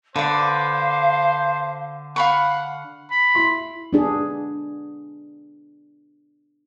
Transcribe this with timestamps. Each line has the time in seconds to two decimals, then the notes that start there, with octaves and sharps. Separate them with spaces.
0.16 D3 B4 C5 D5 F5
2.16 F5 F#5 B5 C#6
3.11 B5
3.35 E4 C6
3.93 B3 D4 G#4